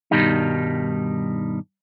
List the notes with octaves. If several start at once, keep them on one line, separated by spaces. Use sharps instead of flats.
G2 B2 D#3 G3 D#4